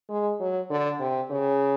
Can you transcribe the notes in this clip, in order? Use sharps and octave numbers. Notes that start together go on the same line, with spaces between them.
G#3
F#3
D3
C3
C#3